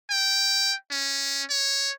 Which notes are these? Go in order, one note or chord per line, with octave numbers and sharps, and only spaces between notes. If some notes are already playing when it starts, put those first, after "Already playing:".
G5
C#4
C#5